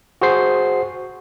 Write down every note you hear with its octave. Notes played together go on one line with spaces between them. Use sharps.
F#4 G#4 C5 C7